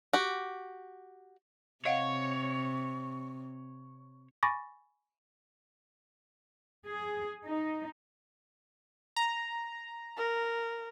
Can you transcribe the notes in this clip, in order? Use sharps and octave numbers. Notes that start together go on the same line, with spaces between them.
F#4 G4
C3 C#5 D#5 F5 F#5
G#5 B5 C#6 D6 A6 A#6
G#4
D#4
A#5
A#4